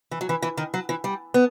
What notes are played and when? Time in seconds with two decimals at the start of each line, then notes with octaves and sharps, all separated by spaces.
0.11 E3
0.21 F#3
0.29 E3
0.42 E3
0.57 D#3
0.74 F#3
0.89 E3
1.04 G3
1.34 B3